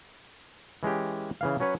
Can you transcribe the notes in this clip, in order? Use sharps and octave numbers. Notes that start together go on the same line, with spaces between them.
E3 G#3 C#4 G4
C#3 E3 F5
F#3 C#4 B4 C#5